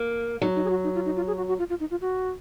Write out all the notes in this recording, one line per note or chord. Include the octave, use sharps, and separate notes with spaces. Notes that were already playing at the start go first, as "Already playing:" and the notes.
Already playing: A#3
F#3 D#4
D#4
G#4
F#4
D#4
F4
D#4
F4
G#4
F#4
F#4
F4
F4
D#4
F4
F#4